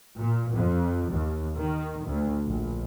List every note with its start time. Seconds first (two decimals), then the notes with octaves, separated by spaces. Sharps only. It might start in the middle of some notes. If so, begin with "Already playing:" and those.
0.17 A#2
0.54 F2
1.09 D#2
1.56 D#3
2.07 D2
2.46 A#1